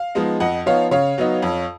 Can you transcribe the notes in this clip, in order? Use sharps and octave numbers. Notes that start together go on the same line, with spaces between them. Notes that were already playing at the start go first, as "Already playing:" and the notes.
Already playing: F5
F3 G#3 B3 D#4
F2 D#5 F#5
F3 B3 D#4 C#5 F5
C#3 C#5 F5
F#3 B3 D#4
F2